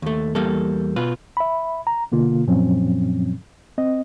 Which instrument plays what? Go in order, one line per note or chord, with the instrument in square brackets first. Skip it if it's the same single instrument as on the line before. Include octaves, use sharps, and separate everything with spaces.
[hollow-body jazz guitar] D#2 A3
E2 G3 A#3 A4
B2 F4 B4
[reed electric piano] E5 B5
A#5
B2 D3 A#3 F4
F#2 A#2 F3 F#3 C4 C#4
C4 D#5